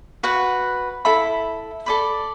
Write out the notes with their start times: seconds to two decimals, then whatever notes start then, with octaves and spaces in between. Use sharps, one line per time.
0.23 F#4 B4 F#5
1.05 E4 A4 E5 B5
1.86 A4 D5 B5